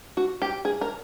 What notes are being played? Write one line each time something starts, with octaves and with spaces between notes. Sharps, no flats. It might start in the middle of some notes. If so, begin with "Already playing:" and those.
F#4
G4
G#4
A#4